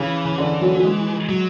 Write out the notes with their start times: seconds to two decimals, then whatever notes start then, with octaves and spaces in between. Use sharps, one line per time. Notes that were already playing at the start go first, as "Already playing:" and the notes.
Already playing: C#3 E3
0.25 C#3
0.38 D3
0.61 F#3
0.75 F#3
0.84 G#3
1.29 F#3